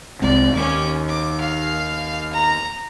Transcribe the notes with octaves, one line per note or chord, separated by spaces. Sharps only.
C2 G#3 C4 D5
D#2 C#4 D6
D6
F5
A#5